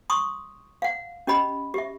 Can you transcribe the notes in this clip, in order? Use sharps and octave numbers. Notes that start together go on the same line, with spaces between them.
C6 C#6 D#6
F5 F#5
C#4 G4 D#5 B5
G4 E5